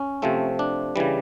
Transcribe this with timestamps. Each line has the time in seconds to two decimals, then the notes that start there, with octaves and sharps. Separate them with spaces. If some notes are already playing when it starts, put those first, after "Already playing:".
Already playing: C#4
0.22 C3 F3 A3 C4
0.59 D4
0.96 C#3 E3 G3